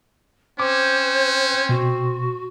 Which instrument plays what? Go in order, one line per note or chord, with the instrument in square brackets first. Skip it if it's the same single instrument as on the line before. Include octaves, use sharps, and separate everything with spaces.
[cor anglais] C4 [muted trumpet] C#4 [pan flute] C5 [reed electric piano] D6
[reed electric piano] B2 [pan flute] F#4